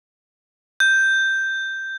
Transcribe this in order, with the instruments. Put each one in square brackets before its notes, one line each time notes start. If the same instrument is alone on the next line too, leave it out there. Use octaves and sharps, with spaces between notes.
[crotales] G6